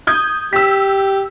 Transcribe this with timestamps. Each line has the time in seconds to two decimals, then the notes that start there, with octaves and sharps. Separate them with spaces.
0.07 D#6 G6 G#6
0.53 G4 E6 B6